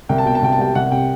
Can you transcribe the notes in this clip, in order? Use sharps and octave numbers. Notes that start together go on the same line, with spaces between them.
C2 G5
A5
B2 G5
A5
C2 G5
A5
G3 G5
C2 F#5
C3 G5